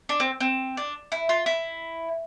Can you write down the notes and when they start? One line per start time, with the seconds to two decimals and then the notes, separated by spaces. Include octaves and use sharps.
0.09 D4
0.20 C4
0.40 C4
0.77 D4
1.12 E4
1.29 F4
1.46 E4